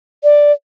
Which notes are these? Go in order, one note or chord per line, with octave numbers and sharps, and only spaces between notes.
D5